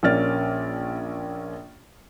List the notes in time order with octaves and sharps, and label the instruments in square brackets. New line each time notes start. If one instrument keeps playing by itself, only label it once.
[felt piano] A#1 A#3 C#4 D5 F6 A6